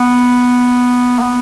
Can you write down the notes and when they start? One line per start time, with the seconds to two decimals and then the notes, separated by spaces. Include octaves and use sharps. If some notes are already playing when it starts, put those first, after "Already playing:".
Already playing: B3
1.19 A#3
1.22 B3